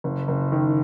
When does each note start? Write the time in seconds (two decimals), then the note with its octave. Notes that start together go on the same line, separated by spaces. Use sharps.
0.04 F#1
0.28 F#1
0.52 D#3